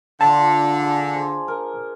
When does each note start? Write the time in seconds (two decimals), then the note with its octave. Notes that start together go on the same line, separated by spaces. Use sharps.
0.21 D3 D4 F4 A5
0.81 G#4
1.15 G#4 C5
1.48 A#4